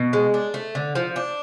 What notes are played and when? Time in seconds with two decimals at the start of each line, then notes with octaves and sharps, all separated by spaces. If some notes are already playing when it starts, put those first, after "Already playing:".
Already playing: B2
0.13 G#3
0.34 D4
0.54 A3
0.75 D3
0.95 F3
1.16 D4